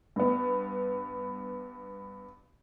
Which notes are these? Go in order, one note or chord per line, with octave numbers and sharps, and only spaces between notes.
G2 B3